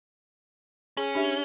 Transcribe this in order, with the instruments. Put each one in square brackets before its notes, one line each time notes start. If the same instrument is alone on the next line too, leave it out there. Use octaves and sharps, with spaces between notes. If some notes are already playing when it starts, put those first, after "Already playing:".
[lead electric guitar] C#4 [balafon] G#4
[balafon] D4 G4 E5